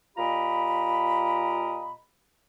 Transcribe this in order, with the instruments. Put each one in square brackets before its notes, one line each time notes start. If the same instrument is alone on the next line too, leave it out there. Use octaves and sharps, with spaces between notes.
[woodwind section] A#2 F4 G4 D#5 A#5 B5